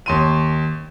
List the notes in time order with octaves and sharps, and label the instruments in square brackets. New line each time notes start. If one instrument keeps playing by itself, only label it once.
[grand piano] D#2 C6 D#7